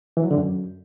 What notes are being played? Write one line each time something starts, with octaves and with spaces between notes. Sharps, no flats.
E3
F#3
D3
F#2